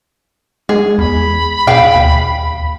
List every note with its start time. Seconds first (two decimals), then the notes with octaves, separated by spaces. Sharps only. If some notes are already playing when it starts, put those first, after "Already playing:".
0.69 G#3 G#4
0.98 E2 B5
1.67 B2 G#4 F5 G5
1.95 D#2